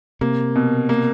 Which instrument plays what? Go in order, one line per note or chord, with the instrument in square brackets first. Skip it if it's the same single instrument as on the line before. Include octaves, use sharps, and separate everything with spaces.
[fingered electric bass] C3 [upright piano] A#3
[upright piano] B2
A#3